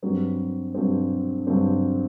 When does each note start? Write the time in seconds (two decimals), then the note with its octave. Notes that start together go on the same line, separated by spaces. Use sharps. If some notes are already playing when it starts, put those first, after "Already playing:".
0.03 G2 F#3 C4
0.74 G2 F#3 C4
1.47 G2 F#3 C4